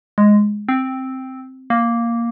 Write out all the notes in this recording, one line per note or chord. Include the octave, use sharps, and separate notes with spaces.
G#3
C4
A#3